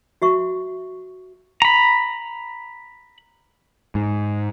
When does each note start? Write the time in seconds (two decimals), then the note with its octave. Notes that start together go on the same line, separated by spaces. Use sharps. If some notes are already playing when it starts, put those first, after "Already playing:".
0.22 F#4 E5 C#6
1.62 A#5 B5
3.95 G#2